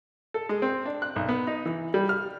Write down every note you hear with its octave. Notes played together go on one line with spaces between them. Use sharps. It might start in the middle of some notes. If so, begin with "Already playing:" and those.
A4
G#3
C4
D4
F#6
B1
B3
D#4
E3
G3
F6